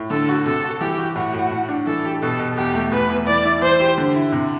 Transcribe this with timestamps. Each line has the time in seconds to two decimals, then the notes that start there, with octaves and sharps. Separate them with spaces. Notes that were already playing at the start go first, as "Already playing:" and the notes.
Already playing: A2
0.10 D3 A4
0.29 F#4
0.46 C3 A4
0.64 F#4
0.81 E3 G4
0.98 F#4
1.16 A2 F#4
1.34 A2
1.51 A2
1.69 D4
1.87 E3 A4
2.05 G4
2.22 B2 A4
2.39 B2
2.57 E2 G4
2.74 A3
2.92 E2 B4
3.10 E2
3.27 E3 D5
3.45 E4
3.62 E3 C5
3.80 G4
3.98 D3
4.15 E4
4.32 C3